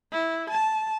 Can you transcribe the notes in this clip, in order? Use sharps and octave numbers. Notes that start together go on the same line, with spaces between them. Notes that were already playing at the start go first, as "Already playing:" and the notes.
E4
A5